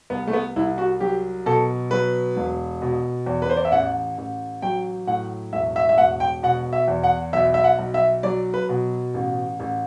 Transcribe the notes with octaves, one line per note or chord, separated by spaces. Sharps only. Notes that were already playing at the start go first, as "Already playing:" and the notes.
C2 B3
A3
B3
C2 E4
F#4
F#3 G4
B2 A4
F#3 B4
E1
B2
E2
B4
C5
D5
E5
A1 F#5
A1
F#3 G5
A2 F#5
E1 E5
E5
E5
E1 F#5
G5
B2 F#5
E5
E2
F#5
B1 E5
E5
F#5
B1
E5
F#3 D5
B4
B2
A1
A1